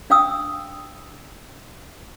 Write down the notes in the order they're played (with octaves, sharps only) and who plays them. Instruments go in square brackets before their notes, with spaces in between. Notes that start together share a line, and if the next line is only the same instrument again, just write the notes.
[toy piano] D4 F5 G5 D#6 E6